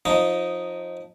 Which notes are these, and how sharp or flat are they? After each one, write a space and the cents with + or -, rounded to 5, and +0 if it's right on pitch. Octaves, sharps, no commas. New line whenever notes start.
F3 +20 D#4 +0